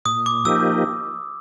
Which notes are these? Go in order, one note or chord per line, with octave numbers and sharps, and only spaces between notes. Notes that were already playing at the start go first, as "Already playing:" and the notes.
A#2 D#6
D6
F3 A#3 D#4 G4 E6